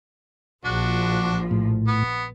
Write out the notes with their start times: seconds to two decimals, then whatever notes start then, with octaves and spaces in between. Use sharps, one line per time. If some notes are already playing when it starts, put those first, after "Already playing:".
0.65 A#1 F3 D4 F#4
1.51 A2
1.87 B3